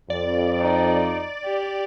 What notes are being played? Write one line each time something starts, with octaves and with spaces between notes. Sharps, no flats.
F2 D5
D#4
G4